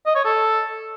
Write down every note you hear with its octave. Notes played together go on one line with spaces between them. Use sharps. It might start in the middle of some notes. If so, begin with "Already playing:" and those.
D#5
C#5
A4